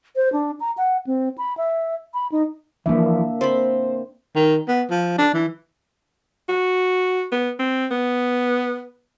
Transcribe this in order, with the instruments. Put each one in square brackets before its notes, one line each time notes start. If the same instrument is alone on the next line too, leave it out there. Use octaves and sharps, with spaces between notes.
[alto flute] C5
D4
A#5
F#5
C4
B5
E5
B5
D#4
[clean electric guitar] E3 F3 [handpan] A#3 D4 E5
[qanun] C4 B5 [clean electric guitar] C5
[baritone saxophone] D#3
B3
F3
D4
E3
[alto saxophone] F#4
B3
C4
B3